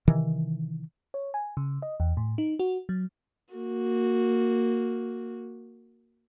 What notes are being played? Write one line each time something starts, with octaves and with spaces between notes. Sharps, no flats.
C3 D#3 E3
C#5
G#5
C#3
D#5
E2
A2
D#4
F#4
F#3
A#3 F#4